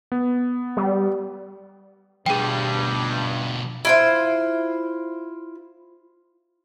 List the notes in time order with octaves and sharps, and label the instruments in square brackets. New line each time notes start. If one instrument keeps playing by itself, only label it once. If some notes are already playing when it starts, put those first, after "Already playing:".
[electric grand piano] B3
[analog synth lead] G3
[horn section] G2 [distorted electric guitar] B2 F3 [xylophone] G#4 G5
[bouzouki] E4 F4 C5